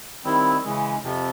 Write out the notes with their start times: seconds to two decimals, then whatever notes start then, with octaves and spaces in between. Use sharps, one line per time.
0.24 D#3 G3 C4 E4
0.64 C#3 E3 G#3
1.03 F2 C3 F3